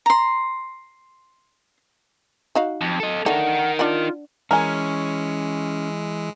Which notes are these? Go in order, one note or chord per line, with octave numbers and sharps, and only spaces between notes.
A#5 C6
D#4 F#4 F5
F2
A4 D#5
A3 D4 D#4 A#4 F#5
D4 F4 D5 F#5
E3 G#3 C#4 A#4 G#5